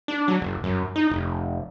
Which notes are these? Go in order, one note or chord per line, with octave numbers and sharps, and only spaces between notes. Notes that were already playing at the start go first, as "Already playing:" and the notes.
D4
F#3
F#1
F#2
D#4
F1